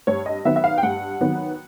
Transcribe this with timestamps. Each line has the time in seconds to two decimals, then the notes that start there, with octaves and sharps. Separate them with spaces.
0.07 G2 C#5
0.26 D#5
0.45 D#3 F#3 B3 E5
0.56 E5
0.64 F5
0.78 G5
0.83 G2 F#5
1.21 D#3 F#3 B3